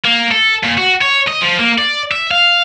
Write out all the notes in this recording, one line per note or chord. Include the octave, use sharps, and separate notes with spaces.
A#3
A4
A#2
F#4
C#5
D#5
F3
A#3
D5
E5
F5